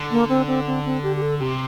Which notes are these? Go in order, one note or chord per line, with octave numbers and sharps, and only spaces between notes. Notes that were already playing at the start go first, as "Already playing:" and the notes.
Already playing: D3
A#3
C4
C4
C4
C4
G4
G4
A4
C3 G4